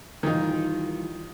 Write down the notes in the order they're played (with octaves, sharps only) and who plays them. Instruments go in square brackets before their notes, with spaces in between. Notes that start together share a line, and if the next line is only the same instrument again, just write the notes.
[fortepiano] D#3 D#4 [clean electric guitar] E3 G3 F4